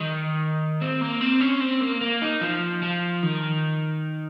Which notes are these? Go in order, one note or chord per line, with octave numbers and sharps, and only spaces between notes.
D#3
C4
A#3
C4
C#4
C4
A#3
A#3
D#4
F3
F3
D#3